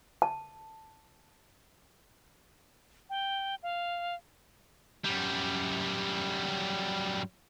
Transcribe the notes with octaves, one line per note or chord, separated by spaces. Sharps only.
A5
G5
F5
F#2 G3